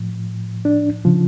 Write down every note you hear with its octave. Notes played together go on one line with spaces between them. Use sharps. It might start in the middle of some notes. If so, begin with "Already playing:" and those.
Already playing: A2 F3
D4
C#3 F3